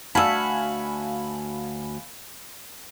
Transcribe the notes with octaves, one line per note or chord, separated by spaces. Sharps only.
D2 F#4 F5 G#5 A5 B5 E6